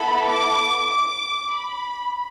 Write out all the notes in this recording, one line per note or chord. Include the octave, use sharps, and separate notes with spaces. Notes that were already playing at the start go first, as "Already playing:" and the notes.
Already playing: B3 E4 A4 B5
D6
D6
B5